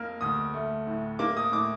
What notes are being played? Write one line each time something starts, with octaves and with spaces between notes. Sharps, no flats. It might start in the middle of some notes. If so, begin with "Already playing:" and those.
Already playing: F2 A#3 F6
D2 D#6
A3
A2
A#3 D6
D#6
A2 D6